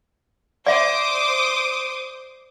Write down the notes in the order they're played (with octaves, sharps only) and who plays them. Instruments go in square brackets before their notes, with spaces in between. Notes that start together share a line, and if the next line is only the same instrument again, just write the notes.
[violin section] C5 D6 D#6 [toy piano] D5 E5